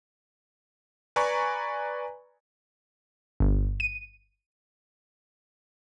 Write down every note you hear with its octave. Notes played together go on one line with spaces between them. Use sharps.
B4 D5 G#5 A#5 B5 C#6
G1
D#7